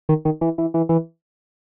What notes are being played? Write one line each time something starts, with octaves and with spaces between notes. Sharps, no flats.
D#3
D#3
E3
E3
E3
E3